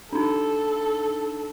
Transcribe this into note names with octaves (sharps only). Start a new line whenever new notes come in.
D4 D#4 A4